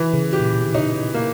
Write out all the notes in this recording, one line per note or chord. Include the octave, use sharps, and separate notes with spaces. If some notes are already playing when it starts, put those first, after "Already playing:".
Already playing: E3
C#3
G4
A#2
B2
D#3
C#3 D#4
A#3